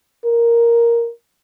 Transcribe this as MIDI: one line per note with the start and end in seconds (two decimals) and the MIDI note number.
0.25 1.10 70